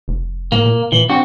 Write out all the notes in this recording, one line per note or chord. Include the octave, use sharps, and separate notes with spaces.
F1
A2 A#3
A#2
A#2 E3
C4 D4 F#4